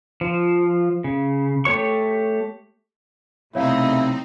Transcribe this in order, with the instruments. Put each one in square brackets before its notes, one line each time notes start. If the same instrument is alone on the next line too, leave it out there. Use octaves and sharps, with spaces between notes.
[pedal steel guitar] F3
C#3
A3 G4 C#5 C#6
[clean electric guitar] B1 C3 [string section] A3 C4 D#4 [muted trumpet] E4 [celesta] C#5 F5